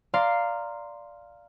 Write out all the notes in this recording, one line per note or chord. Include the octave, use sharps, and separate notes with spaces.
D5 F5 A#5 C6